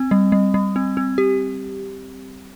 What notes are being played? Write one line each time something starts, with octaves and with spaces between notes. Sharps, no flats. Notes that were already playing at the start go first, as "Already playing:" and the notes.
Already playing: C4
G3
G3
G3
C4
C4
G4